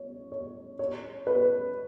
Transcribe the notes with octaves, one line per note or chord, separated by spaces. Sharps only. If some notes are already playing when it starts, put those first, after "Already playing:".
Already playing: C#5
C#5
C#5
B4